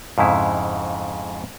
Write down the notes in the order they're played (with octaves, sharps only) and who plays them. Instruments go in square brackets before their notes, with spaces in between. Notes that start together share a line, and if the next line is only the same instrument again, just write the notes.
[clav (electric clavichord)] F2 G#2 C#3 E4